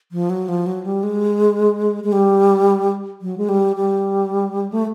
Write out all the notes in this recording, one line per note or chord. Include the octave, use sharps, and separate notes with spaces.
F3
F#3
F3
F#3
G3
G#3
G#3
G3
F#3
G#3
G3
G3
A3